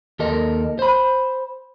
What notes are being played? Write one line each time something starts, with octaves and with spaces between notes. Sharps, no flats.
D#2 G4 A4 A#4 D#5
C5 B5